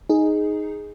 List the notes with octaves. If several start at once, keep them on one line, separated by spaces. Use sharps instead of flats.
D#4 G#4